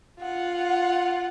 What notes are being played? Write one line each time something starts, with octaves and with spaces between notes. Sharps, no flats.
F4 F#5